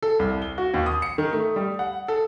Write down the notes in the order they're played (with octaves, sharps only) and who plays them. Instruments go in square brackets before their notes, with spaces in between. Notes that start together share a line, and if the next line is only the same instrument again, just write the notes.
[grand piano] A4
C2
G7
F#4
D#2
D#6
C#7
D#3
A3
G3
F#5
A4